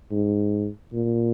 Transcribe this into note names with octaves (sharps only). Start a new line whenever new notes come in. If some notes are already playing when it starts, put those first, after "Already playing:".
G#2
A#2